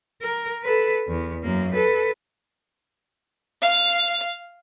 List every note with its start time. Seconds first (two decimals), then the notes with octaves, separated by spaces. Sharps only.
0.22 A#4
0.63 A4 B4
1.08 E2
1.43 F#2 A#3
1.74 A4 B4
3.63 F5